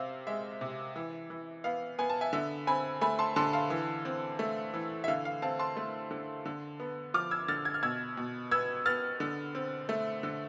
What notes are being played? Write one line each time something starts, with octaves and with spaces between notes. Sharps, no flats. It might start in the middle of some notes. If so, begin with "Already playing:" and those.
Already playing: C3 C4 E5 F5
G#3 E5
C3
E3
E3
B3 F5
B3 G#5
A5
E5 G#5
D3 E5
C4 G#5 B5
A3 G#5 B5
A5 C6
D3 A5 C6
F5 A5
E3
C4
A3
E3
E5
D3 F5
F5
C4 F5 A5
A5 C6
A3
D3
D3
B3
F3 D6 F6
E6 G#6
D3 F6 A6
G#6
F6
B2 E6 G#6
B2
B3 E6 G#6
B3 F6 A6
D3
C4
A3
D3